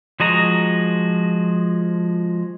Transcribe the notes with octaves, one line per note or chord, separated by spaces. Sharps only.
F3 G#3 F#4 D#5 A#5